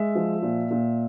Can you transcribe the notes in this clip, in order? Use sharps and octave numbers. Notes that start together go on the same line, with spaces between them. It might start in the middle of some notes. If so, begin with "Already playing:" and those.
Already playing: G#3 E5
F3
A#2
A#2